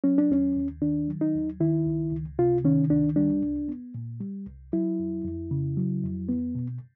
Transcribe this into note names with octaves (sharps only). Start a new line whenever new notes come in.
F#3 C#4
D4
D#2 C#4
D#2
D#3 D4
F#3
D#4
D#2
D#3 E4
C#2
C#2
C3 F4
D#3 C#4
C#2 D4
G3 D4
C2
B3
A#2
G3
C2
F#3 E4
F2
F2
C#3
F#3
F2
B3
B2